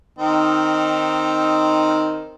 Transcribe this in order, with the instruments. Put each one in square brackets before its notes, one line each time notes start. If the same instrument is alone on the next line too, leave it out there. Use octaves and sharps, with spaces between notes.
[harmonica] D#3 C4 D#4